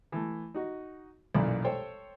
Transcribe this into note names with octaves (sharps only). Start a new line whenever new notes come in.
E3 A3
D#4 F#4
B1 F#2 A#2 E3 D5 B5
A4 C5 C#5 G5